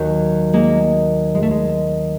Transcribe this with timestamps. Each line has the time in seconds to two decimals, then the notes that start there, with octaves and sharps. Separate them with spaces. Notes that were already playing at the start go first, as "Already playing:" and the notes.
Already playing: D#2 D#3 F#3
0.53 G#3 A#3
1.35 G#3
1.43 A3
1.51 G#3